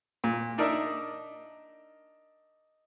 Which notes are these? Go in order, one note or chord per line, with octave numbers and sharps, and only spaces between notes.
A#2
D4 D#4 A#4 D5 E5